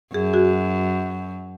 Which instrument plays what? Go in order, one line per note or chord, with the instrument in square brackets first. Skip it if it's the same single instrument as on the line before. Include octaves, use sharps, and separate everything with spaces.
[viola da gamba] F#2 [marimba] G#4
[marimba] F#4 G#4